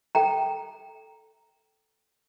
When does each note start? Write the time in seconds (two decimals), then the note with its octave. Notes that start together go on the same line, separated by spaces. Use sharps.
0.15 A4 G5 A#5